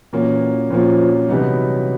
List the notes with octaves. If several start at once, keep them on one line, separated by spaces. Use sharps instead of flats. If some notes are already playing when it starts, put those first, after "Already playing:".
A#2 E3 F#3 A#3 C#4 F4
A#2 F3 F#3 A#3 C#4 F4
C3 E3 F#3 G3 B3 D#4